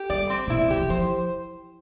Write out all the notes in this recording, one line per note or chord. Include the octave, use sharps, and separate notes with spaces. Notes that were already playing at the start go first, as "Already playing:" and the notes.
Already playing: G4
G3 D5
C4
B2 E4
C3
D3 G4
E3
F3 C5